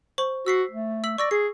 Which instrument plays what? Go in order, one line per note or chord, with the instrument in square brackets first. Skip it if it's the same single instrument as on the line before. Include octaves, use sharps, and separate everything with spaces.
[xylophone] C5 C#6 F#7
[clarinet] F#4 [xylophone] E6 B6 C7
[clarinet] A3
[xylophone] E6 B6 F#7
[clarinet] D5 [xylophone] C#6 E6 A#6
[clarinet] G#4 [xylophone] C7